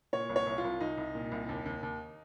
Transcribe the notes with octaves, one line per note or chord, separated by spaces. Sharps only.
A#2 C#5
C2
C#5
C2
F4
C2
C2 D#4
C2
A#2
C2
D#2
D#2
D#2